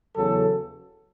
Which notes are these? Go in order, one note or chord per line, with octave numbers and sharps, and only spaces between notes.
E2 C#3 F#3 A4